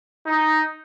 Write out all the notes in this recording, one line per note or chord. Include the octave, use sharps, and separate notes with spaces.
D#4